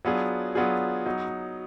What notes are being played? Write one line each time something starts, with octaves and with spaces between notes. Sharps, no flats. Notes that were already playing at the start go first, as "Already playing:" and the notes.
F#3 B3 D4 F4 G#4
F#3 B3 D4 F4 G#4
F#3 B3 D#4